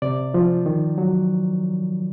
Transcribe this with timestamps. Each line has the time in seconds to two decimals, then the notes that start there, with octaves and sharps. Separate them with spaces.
0.02 C3 D5
0.34 F3
0.66 D#3
0.98 F#3